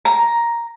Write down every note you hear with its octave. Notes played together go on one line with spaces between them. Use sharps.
A#5